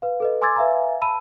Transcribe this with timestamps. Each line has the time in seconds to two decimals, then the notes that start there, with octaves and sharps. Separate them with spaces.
0.02 B4 F5
0.20 A4 B4 D#5
0.41 G#5 C6 D6 E6 G#6 A6
0.56 B4 E5 F5 G#5 A#5
1.01 A5 B5 E6 D#7